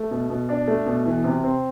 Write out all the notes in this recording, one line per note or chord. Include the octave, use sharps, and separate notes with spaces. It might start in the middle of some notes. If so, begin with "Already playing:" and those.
Already playing: A3
B2
B2
D4
A3
B2
E3
C3
C4